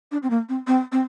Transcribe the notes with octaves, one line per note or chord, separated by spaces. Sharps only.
D4
C4
A#3
C4
C4
C4